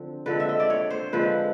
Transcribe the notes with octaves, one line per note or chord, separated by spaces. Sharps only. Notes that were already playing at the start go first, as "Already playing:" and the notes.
Already playing: D3 F3 C4
D3 F3 G#3 C4 B4
E5
D#5
D5
C#5
C5
D3 F3 G#3 C4 B4